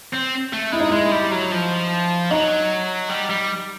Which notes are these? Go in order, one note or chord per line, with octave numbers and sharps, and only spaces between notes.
C4
A3
G#3 E4
D#4
G#3 E4
G3
F#3
F3
F#3 D#4
G3
G3